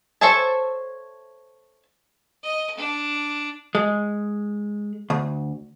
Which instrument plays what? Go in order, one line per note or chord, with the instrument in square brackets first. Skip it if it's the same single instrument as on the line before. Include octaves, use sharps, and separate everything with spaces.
[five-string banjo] A4 C5 C#5 E5 A5
[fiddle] D#5
D4
[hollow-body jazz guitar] G#3
D2